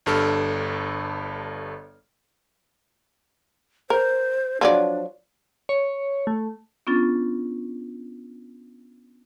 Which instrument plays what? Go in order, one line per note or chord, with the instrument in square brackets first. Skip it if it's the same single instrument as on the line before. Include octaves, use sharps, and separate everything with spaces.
[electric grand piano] G1 G2 A4 F6
[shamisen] A#4 [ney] C5
[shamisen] F3 F#3 D5 [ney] D4
[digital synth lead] C#5
A3
[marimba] B3 C#4 D4 F4 A6